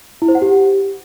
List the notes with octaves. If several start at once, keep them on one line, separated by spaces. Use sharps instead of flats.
E4
C5
F#5
G4